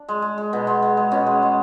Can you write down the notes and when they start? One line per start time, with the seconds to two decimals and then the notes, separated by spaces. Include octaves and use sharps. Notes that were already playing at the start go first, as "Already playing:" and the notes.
Already playing: D4
0.08 G#3
0.22 G#3
0.38 G#3
0.53 B2
0.67 G#3
0.83 G#3
0.97 G#3
1.12 B2 C#4
1.27 G#3
1.42 G#3